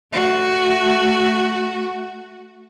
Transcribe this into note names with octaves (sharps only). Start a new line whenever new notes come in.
A3 F#4